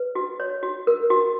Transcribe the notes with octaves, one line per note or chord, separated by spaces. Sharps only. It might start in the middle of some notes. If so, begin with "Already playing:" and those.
Already playing: B4
F#4
C#5
F#4
A#4
F#4